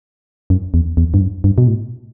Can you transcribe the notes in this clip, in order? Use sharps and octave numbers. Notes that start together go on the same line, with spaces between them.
F#2
E2
E2
G2
F#2
G2
B2
A2